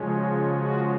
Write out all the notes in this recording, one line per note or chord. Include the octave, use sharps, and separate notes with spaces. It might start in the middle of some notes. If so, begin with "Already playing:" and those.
Already playing: C#3 F3 G#3 C#4
F#4
F#4